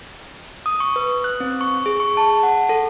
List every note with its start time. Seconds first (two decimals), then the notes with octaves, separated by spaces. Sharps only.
0.66 D#6
0.80 C#6
0.96 B4
1.24 F#6
1.40 C4
1.61 C#6
1.86 G#4
2.00 C#6
2.17 A5
2.43 F#5
2.69 A4